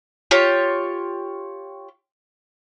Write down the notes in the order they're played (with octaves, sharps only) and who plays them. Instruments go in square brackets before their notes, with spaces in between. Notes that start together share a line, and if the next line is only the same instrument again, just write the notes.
[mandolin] F4 G4 C#5